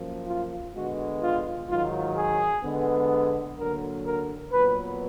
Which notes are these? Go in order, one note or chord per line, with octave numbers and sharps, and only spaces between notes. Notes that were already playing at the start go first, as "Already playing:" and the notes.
Already playing: F#2 F3 A#3
F4
D3 G#3 B3 F#4
F4
G#2 D#3 F#3 F4
G#4
D3 G#3 B3
D3 F#3 A#3 A#4
A#4
A#2 F#3 B3 B4